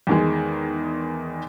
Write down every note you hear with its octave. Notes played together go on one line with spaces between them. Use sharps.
E2 D#3 G#3